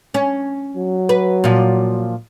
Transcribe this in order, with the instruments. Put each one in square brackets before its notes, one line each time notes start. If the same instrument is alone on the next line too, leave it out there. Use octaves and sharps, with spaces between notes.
[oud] C#4
[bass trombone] F#3
[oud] B4
A#2 F3